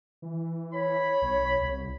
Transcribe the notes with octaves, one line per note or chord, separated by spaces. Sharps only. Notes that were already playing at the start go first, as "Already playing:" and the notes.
E3
C#5 B5
B1
C2